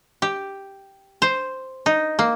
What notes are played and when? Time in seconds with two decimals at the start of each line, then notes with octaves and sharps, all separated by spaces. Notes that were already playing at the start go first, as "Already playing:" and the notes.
0.22 G4
1.22 C5
1.86 D#4
2.19 A#3